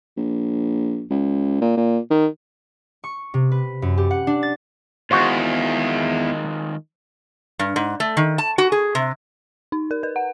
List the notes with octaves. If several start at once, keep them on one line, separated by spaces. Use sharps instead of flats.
A#1
C#2
A#2
A#2
D#3
C#6
C3
B4
F#2
G4
F#5
D4
A6
E2 D#3 G#3 F4 F#4 C5
G2
G#2
A3
D#3
A5
F#4
G#4
C3
D#4
A#4
B4
F#5